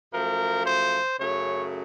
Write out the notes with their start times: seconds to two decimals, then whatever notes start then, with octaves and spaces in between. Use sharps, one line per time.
0.13 F#2 F3 A3 A#4
0.66 C5
1.19 F#2 C#3 A3 C#5